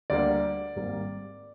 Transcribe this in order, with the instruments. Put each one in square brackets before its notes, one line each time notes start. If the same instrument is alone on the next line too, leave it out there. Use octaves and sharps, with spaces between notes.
[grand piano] D2 D3 G3 A#3 D5
G#1 G#2 G3 A#3